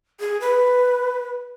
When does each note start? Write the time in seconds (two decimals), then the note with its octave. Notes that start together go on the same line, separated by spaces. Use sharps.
0.20 G#4
0.41 B4